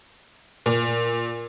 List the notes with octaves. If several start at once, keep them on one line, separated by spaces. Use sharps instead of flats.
A#2